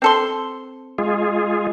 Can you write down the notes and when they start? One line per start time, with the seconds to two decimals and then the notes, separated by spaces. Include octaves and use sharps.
0.02 C4 A4 C6
0.98 G#3 F4 G#4